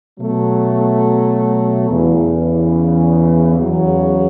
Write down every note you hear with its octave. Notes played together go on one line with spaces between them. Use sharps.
B2 F#3 A3
E2 C#3 E3
E2 C#3 F#3